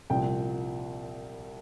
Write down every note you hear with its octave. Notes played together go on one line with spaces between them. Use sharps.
C2 A#2 F3 G5